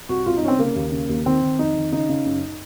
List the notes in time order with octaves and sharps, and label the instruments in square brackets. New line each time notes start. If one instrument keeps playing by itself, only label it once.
[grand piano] C2 F#4
C2 F4
D#4
C2 C#4
C4
C#3 A#3
D#2
C#3
D#2
D#3 C4
D#3
F2 D#4
D#3
C#3 D#4
C#3
F#2